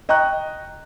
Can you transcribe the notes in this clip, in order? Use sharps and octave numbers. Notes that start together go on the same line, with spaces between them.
D#5 G5 A#5 C#6 F#6